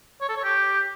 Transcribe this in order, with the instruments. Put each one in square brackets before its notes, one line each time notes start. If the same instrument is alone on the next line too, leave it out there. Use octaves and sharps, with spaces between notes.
[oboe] C#5
A4
C#5
G4